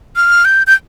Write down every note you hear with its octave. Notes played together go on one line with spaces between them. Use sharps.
F6
G6
G6